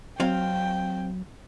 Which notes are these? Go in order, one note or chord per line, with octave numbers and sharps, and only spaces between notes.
F#3 C4 F5 G5